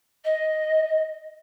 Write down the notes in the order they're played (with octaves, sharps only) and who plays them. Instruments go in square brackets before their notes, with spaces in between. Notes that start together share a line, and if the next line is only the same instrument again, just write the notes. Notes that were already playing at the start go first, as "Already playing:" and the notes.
[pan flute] D#5